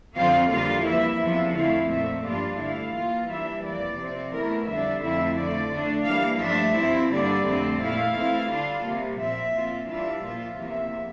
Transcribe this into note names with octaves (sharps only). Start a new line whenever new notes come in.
F2 D3 F3 C4 F4 F5
F2 D3 G3 A#3 F4 F5
E3 A#3 E4 E5
E2 C3 F3
F2 D3 A3 E4 F5
A#2 A3 C4 E5
G2 F3 A#3 D4 F4 D5
D3 A3 E4 F5
E3 A#3 F4
E3 G3 A#3 D4 E5
F2 E3 A#3 D5
C3 F3 C4
E2 E3 A3 E4 A#4
F2 D3 G3 D4 E5
F2 D3 A3 C4 E4 E5
D3 F3 A3 D5
D3 A3 D4
E3 G3 A#3 F5
G2 F3 A3 D4 E5
G2 F3 C4 E4
G2 D3 G3 A#3 D4 D5
F2 D3 A3 C4
A#2 A3 E4 F5
E3 A3 C4 E4
D3 G3 D4 F4
C3 G3 A#3
A#2 F3 C4 E5
A#2 F3 C4 F4
E3 G3 D4 F4 E5
A#2 F3 A#3 F4
E2 C3 F3 A#3 E5